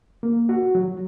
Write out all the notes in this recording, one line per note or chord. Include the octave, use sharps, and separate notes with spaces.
A#3
F#4
F#3